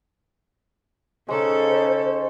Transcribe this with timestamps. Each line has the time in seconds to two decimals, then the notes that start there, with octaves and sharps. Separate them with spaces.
1.28 C#3 G#3 C#4 D#4 A4 C5